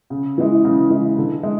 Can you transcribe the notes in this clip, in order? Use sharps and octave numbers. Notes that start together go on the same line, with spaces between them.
C#3
E3 G#3
C#3
E3 G#3
D3
G#3